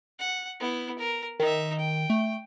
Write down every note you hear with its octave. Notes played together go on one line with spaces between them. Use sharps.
F#5
B3 E4
A#4
D#3 D#4 E5
G5
A3